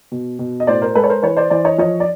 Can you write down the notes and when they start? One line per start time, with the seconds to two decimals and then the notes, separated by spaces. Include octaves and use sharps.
0.12 B2
0.39 B2
0.60 D#5
0.67 A2 C5 D5
0.82 A#4 C5
0.95 G#3 A4 B4
1.04 C#5
1.09 A#4 C5
1.23 E3 B4 C#5
1.37 C5 D5
1.50 E3 C5 D5
1.65 C#5 D#5
1.78 F3 C#5 D#5
2.00 D5